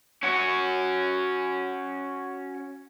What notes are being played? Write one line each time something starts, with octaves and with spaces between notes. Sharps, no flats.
C#4 F#4